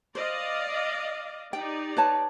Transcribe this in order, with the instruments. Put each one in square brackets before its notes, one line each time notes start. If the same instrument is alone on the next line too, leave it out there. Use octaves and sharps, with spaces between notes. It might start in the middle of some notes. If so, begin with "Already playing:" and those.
[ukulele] C5 [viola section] D5 D#5 F5
[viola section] D#4 G4 D5 [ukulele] G5
[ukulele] B4 C#5 A5